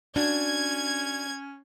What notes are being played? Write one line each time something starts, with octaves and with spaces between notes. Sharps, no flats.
C#4 D4 F#4 G#6